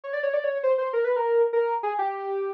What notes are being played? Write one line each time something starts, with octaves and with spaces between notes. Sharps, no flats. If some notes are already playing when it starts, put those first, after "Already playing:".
C#5
D5
C#5
D5
C#5
C5
C5
A#4
B4
A#4
A#4
G#4
G4